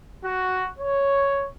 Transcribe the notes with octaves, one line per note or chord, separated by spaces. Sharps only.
F#4
C#5